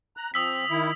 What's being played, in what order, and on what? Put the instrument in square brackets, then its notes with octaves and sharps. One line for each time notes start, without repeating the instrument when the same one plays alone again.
[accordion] A#5 F#6
[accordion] F3 C4 [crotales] D#6 E6 B6
[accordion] D#3 E4